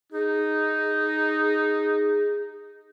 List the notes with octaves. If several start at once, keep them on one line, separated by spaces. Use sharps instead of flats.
D#4 G#4